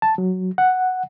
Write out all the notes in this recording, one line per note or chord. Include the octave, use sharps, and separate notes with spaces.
A5
F#3
F#5